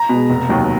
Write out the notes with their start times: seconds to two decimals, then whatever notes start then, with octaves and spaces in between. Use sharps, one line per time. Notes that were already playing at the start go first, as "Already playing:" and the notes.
Already playing: A#5
0.09 B2 G#3
0.30 F1
0.49 D#2 D#3 F#3